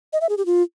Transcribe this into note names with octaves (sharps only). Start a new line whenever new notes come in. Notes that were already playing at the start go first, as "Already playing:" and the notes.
D#5
E5
G#4
G4
F4